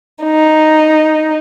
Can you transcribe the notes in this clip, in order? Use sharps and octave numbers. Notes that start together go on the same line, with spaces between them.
D#4